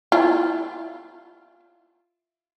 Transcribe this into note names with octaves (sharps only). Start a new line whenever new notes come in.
E4 F4